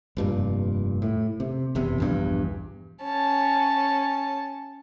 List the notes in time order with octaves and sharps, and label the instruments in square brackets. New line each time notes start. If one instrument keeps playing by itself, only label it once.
[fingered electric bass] F1 G2 A#2
A2
C3
F#1 E2 C3
A#1 E2 G2
[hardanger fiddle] C#4 A5